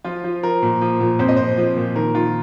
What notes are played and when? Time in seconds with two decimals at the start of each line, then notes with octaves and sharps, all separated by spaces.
0.04 F3 F4
0.24 F3
0.43 F3 A#4
0.62 A#2
0.81 F3
1.00 A#2
1.19 F2 C5
1.29 D#5
1.37 F2 C5
1.57 F3
1.77 A#2
1.95 D#3 A#4
2.14 D#3 F4